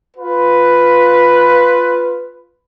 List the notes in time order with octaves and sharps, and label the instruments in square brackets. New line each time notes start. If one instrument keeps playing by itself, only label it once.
[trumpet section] F4 B4